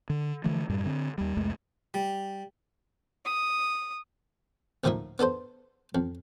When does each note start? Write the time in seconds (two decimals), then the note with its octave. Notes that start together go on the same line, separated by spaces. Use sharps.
0.10 D3
0.44 D3 E3 F3 A3
0.69 F#2 A2 G3
0.86 D3 C4
1.18 D#2 G3
1.37 C2 F2 G#3 A3
1.94 G3
3.25 D#6
4.84 D2 A2 F3 A#3 D#4 E5
5.19 B3 D4 A4 C5
5.95 F2